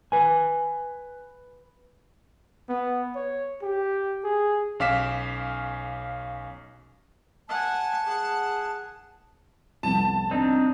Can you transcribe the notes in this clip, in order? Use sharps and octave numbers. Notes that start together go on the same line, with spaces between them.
B4 G#5
B3
C#5
G4
G#4
B1 C#4 F5 D6 B6 E7
F#5 G#5 A5
G#4 F#5
C2 F2 B3 A5
C4 D4 D#4